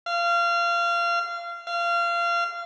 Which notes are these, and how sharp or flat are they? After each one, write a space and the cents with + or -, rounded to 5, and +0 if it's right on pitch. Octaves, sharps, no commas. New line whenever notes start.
F5 -25
F5 -25